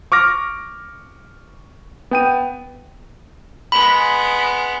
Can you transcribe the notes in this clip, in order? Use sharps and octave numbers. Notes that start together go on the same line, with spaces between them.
C#6 D6 F6 A#6
B3 G5 D#7
G#3 B3 B5